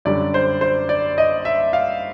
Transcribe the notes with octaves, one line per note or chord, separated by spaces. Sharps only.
F#2 D3 G3 D5
C5
C5
D5
D#5
E5
F5